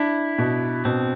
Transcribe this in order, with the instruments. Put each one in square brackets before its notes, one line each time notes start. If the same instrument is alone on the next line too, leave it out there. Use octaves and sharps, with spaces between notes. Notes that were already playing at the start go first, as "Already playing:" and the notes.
Already playing: [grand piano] D4 [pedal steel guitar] E4
[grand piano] B2
[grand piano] B2 [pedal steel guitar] C4